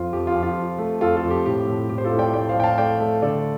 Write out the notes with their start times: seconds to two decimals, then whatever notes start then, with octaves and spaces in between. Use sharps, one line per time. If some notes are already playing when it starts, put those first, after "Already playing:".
Already playing: F2 F3 F4
0.13 F2 G4
0.27 F4
0.35 F2
0.43 F4
0.57 F3
0.78 A3
1.01 F2 F4 A4
1.16 F4 A4
1.23 F2
1.30 G4
1.46 A2 G4
1.67 A2
1.89 A2 G4
1.98 C5
2.05 F4 A4
2.13 A2
2.19 D5 G5
2.34 A3 D5 G5
2.49 C5 F5
2.56 A2 G5
2.63 F5 A5
2.78 A3 D5 G5
3.00 A3
3.22 D3 A4 D5